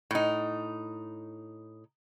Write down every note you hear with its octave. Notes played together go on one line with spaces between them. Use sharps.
A2 D#4